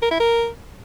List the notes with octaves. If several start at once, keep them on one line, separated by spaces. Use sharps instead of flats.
A#4
E4
A#4